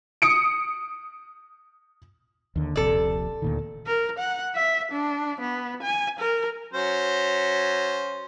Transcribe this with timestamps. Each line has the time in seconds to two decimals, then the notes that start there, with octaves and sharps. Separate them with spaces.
0.22 D#6 C#7 D7
2.56 D#2 D3
2.76 D#1 A#1 C3 A4 D5
3.42 D2 A#2 D#3
3.86 A#4
4.19 F#5
4.55 E5
4.91 D4
5.40 B3
5.82 G#5
6.19 A#4
6.73 F#3 C#4 C5